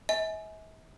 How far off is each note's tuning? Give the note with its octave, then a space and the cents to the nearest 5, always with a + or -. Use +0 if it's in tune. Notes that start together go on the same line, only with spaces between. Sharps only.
E5 -45 G#5 +20